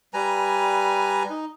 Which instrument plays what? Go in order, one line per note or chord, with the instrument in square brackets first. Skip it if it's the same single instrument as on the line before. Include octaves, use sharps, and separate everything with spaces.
[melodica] G3 B4 G#5 A#5
D#4